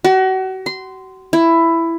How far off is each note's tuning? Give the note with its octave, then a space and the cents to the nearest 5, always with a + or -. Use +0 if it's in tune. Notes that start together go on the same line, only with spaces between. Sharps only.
F#4 +35
C6 -15
E4 +10